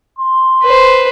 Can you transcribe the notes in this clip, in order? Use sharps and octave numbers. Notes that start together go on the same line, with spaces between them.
C6
B4 C5